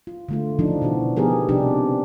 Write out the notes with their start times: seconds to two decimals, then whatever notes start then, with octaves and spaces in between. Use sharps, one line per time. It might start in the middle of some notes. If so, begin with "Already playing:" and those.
0.07 F4
0.29 D3 A3 F4
0.59 C#3 E3 F3 D4 D#4
0.81 B2 E3 F#4
1.17 F3 B3 D#4 G4 G#4 A#4
1.49 C3 F3 C4 D4 D#4 G4